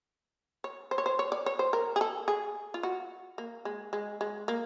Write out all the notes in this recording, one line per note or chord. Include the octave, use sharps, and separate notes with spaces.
C#5
C5
C#5
C5
C#5
D5
C#5
C5
A#4
G#4
A4
G#4
F4
F#4
A#3
G#3
G#3
G#3
A#3